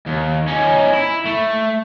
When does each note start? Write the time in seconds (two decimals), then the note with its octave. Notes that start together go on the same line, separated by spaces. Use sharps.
0.06 D#2
0.48 C#4 D#4
0.93 E4
1.25 A3